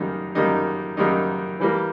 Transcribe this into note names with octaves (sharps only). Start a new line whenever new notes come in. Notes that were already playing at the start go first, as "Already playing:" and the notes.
Already playing: F#2 D#3 G3 A#3 D#4
F#2 D#3 G3 A#3 D#4
F#2 D#3 G3 A#3 D#4
E3 G3 A#3